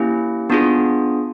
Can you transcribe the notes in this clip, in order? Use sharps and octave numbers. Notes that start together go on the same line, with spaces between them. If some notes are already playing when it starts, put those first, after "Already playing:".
Already playing: A#3 C#4 E4 G4
B3 D4 F4 G#4